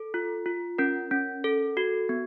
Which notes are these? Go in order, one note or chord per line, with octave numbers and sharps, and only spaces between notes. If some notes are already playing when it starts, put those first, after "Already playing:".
Already playing: A4
F4
F4
C#4 A#4
C#4
A4
F#4
B3